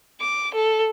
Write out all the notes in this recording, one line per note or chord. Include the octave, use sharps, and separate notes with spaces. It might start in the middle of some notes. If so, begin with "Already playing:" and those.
D6
A4